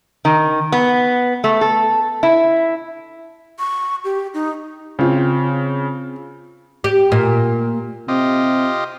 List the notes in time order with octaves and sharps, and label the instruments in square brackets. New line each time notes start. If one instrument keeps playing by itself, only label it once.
[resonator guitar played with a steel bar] D#3
B3
A3
A4
E4
[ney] C#6
G4
D#4
[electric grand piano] C#3 [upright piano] C4 F4
[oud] G4
A#2
[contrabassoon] C3 [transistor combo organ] F4 G4 D#5